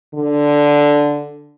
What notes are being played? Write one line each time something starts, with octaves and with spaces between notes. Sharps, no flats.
D3